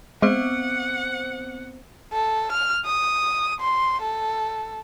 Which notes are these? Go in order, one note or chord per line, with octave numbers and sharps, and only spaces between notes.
G#3 B3 C4 C5 F#5
A4
F6
D#6
C6
A4